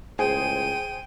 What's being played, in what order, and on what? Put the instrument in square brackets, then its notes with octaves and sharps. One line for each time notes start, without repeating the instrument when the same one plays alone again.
[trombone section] C#2 A2 [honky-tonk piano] G#4 C5 [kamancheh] G5 [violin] D#7